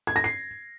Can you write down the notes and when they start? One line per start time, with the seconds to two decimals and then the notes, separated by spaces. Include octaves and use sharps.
0.07 G#6
0.16 A#6
0.24 C7